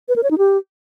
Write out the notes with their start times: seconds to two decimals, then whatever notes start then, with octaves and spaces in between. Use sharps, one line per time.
0.09 B4
0.16 A#4
0.23 C#5
0.31 D#4
0.38 G4